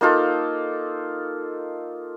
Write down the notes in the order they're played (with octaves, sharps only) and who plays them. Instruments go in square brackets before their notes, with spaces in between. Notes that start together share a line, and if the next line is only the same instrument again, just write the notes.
[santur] A#3 D#4 F4 A4